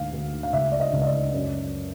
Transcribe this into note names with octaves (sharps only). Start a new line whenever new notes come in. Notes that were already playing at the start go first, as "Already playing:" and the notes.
Already playing: D2 G#2 F5
D2
F5
C#2 E5
D5
D#5
C#2
D#5
D5
F#2